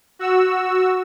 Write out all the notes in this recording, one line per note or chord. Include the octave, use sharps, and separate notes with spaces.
F#4 E6